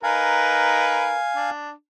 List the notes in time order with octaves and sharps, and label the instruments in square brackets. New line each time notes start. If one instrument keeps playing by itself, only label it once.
[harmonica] D#4 A#4 B4 [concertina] F5 G#5
[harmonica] D4